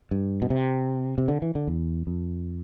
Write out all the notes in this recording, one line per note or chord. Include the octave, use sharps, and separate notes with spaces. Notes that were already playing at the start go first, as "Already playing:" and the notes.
G2
B2
C3
C3
D3
E3
D3
E2
F2